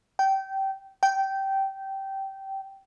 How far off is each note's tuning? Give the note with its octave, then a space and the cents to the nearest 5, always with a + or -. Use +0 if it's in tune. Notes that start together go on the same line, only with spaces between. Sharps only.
G5 -20
G5 -15